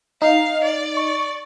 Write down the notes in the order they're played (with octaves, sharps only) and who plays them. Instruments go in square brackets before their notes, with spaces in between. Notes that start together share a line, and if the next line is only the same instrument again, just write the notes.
[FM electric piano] D#4 [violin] F5
[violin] D5
[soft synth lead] C#6